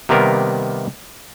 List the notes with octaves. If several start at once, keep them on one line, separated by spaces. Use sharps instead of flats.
C3 D#3 G3 A#3 B3 A#4